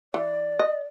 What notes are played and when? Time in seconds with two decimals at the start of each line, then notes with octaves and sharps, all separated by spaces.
0.14 E3 D5
0.59 D#5